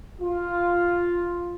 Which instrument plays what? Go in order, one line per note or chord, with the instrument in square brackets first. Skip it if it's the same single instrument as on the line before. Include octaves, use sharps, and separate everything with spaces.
[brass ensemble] F4